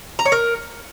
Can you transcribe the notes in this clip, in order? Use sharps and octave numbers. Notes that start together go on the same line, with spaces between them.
A#5
C#5
A#4